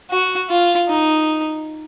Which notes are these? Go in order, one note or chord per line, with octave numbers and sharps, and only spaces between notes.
F#4
F4
D#4